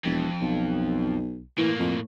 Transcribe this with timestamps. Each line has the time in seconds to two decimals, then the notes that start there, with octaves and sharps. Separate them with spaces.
0.05 E1 F2
0.41 B1
1.58 A2 E3 A#3
1.79 F2